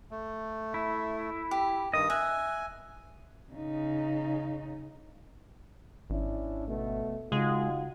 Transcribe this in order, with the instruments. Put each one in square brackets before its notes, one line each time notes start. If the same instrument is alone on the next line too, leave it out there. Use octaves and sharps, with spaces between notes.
[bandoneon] A3
[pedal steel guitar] E4
[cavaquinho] G4
[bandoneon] G2 D#3 D#6 [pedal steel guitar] D#5
[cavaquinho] E5 [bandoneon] G#5 [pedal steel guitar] F#6
[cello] C#3 D#4
[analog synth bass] G#1 [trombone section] C#4 D4 E4
[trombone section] B2 A3
[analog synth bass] C#3 [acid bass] G#3 [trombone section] D#4 F4 F#4